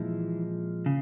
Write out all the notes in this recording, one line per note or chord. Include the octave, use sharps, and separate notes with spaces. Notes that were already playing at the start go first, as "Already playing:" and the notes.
Already playing: A#2 E3 F3 G#3 E4
C#3